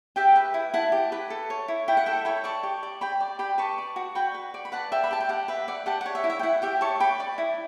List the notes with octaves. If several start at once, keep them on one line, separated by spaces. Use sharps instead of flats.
G4 E5 G5
B4
E4
E4 F#5 A5
G4
B4
A4
C#5
E4
E4 G5 B5
F#5
A4 E5 G5
C#5 G5 B5
D5 A5 C#6
G4
D5
G4 G5 B5
D5
G4 G5 B5
B4 A5 C#6
D5
F#4
F#4 G5 B5
B4
D5
B5
B4 F#5 A5
D5 E5 G5
B5
G4 A5
G5
G4 F#5
B4 E5
D5 F#5
G4 F#5 A5
C#5 F#5
E5
E4
E5
G5
E4 F#5
G4 E5 G5
C#5 A5 C#6
B4 G5 B5
D5
E4